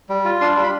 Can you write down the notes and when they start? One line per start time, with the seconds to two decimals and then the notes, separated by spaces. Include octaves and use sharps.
0.09 G3
0.25 F4
0.41 D4 C6
0.56 G3
0.64 B5